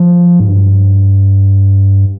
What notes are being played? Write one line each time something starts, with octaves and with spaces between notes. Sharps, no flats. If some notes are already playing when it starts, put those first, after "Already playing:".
Already playing: F3
G#2
G2